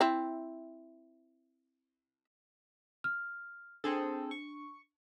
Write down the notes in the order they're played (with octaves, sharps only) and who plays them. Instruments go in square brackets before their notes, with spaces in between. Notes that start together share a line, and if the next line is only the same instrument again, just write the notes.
[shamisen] C4 E4
[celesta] F6
[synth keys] C4 G#4 A4 [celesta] D4
[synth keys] C#6